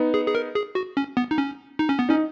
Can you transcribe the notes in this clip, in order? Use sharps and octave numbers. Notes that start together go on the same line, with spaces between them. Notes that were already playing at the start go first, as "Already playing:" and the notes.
Already playing: B3 D#4
G#4
G#4
A#4
G#4
F#4
C#4
B3
D#4
C#4
D#4
C#4
B3
C#4 D#4